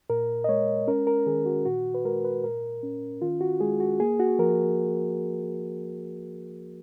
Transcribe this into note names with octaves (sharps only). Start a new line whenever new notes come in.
A#2 A#4
D#5
G#3 C#5
C#4 A#4
A#4
D#3 G#4
F#4
A#2 F#4
B4
G#3 A#4
B4
A#2 A#4
C#4
D#3 F4
F#4
G#3 G#4
F#4
A#3 G#4
F#4
F3 A#4